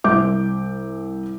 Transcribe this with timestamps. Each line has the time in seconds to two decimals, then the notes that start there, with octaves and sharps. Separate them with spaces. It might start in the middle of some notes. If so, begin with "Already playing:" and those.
0.04 C2 E5 D6 G6